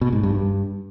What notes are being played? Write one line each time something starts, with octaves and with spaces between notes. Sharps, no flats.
B2
G#2
G2
G2